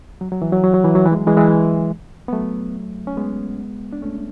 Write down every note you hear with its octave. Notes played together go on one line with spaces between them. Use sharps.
F#3
F#3
E3
F#3
F#3
F#3
E3
F#3
E3
G#3
F#3
E3 G#3
E3 G#3
B3
F#3 A3
C#4
G#3 B3
D4
A3 C#4